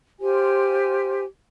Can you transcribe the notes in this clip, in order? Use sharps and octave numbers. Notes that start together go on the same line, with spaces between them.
F4 G4 C5 G#5